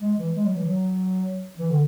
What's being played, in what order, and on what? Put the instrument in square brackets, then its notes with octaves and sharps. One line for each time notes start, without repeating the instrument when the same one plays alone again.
[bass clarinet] G#3
E3
G#3
F#3
E3
F#3
E3
D3